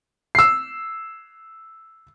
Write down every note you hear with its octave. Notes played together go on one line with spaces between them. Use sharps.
E6 C7